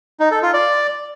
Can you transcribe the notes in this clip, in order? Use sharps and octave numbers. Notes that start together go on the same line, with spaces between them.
D#4
A4
F4
D5